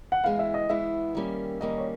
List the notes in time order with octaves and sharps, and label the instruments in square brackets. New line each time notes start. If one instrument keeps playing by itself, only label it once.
[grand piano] F#5
[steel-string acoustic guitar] E3 G#3 B3 E4 [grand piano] F5
[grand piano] E5
D#5
[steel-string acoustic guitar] E3 G#3 B3 E4 [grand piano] E5
[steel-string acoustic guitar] D#3 G3 A#3 C#4
[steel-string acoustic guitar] D#3 G3 A#3 C#4 [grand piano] D#5
[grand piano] C#5